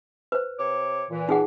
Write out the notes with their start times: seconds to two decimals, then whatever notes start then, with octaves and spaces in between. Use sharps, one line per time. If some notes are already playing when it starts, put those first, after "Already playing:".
0.32 B4 C5
0.59 C3 C#5 D6
1.11 A#2 E3
1.29 D#4 G#4 F#5